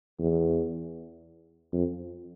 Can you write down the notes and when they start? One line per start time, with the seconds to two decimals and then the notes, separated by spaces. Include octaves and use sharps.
0.19 E2
1.73 F2